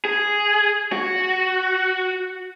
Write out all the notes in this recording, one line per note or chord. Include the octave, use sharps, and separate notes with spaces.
G#4
F#4